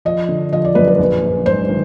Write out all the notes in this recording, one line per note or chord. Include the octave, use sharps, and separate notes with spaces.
F3 D#5
D3
F3 D#5
D5
F#2 B4
B4
A#1
A#1
G#2 C5
D#3